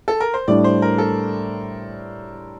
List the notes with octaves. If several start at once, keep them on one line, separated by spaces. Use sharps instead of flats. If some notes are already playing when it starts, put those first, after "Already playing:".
A4
A#4
C5
A2 G3 D4 D5
C5
A#4
A4